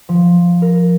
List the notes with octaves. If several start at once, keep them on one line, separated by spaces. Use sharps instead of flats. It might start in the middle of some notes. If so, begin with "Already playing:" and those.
F3
A#4